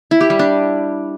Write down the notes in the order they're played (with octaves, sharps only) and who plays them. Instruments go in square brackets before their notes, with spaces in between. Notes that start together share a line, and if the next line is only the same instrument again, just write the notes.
[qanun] E4
G4
G3
D4